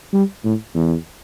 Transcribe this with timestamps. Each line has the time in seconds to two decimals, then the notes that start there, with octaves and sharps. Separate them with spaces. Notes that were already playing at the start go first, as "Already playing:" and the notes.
0.13 G3
0.45 A2
0.75 E2